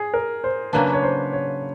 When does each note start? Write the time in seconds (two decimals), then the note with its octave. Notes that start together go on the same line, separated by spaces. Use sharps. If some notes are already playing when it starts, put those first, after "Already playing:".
Already playing: G#4
0.14 A#4
0.44 C5
0.73 C#3 F#3 A#3 D4 B4
0.93 C#5
1.03 C5
1.33 C#5